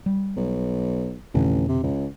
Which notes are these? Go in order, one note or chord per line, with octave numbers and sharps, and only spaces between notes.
G3
B1
A1 F2 B2 D3
C3
C#2